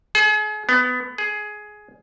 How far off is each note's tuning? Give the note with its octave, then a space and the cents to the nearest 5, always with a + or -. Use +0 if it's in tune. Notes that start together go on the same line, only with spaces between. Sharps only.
G#4 +40
B3 +20
G#4 +15